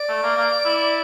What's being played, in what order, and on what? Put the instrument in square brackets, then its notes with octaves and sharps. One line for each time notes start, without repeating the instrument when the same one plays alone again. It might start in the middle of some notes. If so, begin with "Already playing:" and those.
Already playing: [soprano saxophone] D5
[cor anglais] A3
A#3
A#3
E4